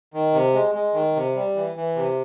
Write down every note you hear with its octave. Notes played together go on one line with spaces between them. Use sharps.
D#3
C3
G#3
G#3
D#3
C3
G3
E3
E3
C3